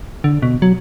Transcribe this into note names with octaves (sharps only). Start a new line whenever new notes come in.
D3
B2
F#3